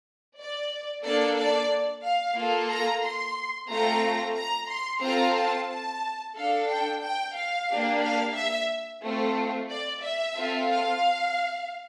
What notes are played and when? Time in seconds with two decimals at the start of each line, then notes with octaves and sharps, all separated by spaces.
0.37 D5
1.04 A#3 D4 A4 D5
1.37 D5
2.03 F5
2.37 A#3 F4 A4
2.70 A#5
3.03 C6
3.70 A3 C4 F4 A4 A#5
4.37 A#5
4.70 C6
5.03 C4 F4 A4 A#5
5.37 A5
5.70 A5
6.36 D4 A4 F5
6.69 G5
7.03 G5
7.36 F5
7.69 A#3 D4 G4
8.03 F5
8.36 E5
9.02 A3 C4 F4
9.69 D5
10.02 E5
10.36 C4 F4 A4
10.69 F5